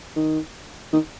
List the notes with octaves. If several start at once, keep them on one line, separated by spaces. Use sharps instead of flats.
D#3
D#3